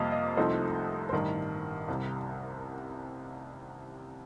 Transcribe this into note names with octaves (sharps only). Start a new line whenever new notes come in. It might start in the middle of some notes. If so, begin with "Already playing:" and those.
Already playing: F2 C3 G3 A#3 D#5 F5
D#5
C2 C3 F3 A3 D#4 C5
C5
A1 G2 D#3 A#4
C2 C3 G3